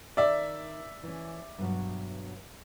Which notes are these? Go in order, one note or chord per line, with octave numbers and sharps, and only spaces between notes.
D#3 D5 E5
E3 C#4
G2 B2 F#3